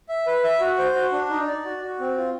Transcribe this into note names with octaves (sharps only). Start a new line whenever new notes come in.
E5
B4
E5
F#4
C5
F#4
D4
D#4
D5
F#4
F#4
C4
F4